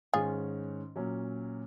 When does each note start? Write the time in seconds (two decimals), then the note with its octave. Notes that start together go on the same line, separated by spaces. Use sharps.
0.14 G#2 D#3 G#3 C#4 F4 G#4
0.96 A#2 F#3 C#4